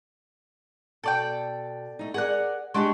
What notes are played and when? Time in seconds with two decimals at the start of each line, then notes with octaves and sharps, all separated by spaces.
1.04 B2 A4 D5 G5
1.99 A3 D#4
2.14 G#4 A#4 D5 F#5 F#6
2.74 G#3 D4 F#4 G4 C6